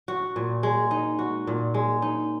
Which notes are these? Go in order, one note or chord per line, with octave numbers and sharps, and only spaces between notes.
F#4
A#2
G#3
D#4
F#4
A#2
G#3
D#4